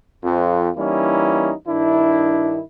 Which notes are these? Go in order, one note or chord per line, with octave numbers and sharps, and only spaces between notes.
F2 F3
E3 G3 A#3 C#4 D#4 E4
G2 D#3 D4 E4